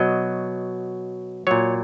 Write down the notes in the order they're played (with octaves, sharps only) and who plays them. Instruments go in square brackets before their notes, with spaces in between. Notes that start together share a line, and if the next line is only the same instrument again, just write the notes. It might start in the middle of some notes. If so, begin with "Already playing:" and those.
Already playing: [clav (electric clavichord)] B2 F#3 D#5
A#2 F#3 C#5